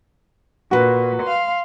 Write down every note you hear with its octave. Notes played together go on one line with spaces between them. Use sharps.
A#2 F#4 B4
F5 C6